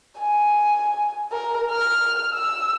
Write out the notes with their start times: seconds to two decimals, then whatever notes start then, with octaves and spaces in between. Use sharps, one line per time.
0.19 G#5
1.32 A#4
1.71 F6
2.33 E6